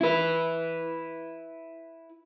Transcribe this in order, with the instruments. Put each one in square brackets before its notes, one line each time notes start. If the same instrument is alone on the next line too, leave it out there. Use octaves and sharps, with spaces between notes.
[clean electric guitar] E4 B4